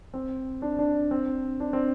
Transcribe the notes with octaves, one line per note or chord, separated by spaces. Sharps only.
C4
D4
D4
C4
D4
C4